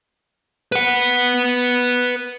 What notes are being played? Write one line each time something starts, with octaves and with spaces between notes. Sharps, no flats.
B4 F#5